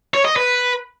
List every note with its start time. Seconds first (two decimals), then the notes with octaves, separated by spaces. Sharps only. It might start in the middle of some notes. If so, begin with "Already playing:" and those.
0.14 C#5
0.25 D#5
0.36 B4